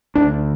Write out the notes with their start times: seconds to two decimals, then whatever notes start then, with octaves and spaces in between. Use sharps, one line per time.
0.15 D2 D4